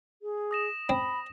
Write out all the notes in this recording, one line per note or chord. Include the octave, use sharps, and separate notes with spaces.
G#4
D#6 A#6 E7
C4 B5